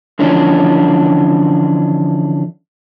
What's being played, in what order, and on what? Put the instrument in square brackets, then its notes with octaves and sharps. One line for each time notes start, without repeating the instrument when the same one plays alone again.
[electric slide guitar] D3 E3 F3 C#4 D4